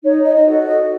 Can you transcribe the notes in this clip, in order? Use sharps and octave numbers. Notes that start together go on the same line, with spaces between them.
D#4 C#5
D#5
D#5
F#4 C#5
A4
D#5